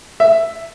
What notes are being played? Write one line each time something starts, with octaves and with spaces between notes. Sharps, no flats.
E5